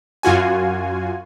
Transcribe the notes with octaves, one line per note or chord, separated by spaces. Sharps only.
F#2 F4 F#4 G#5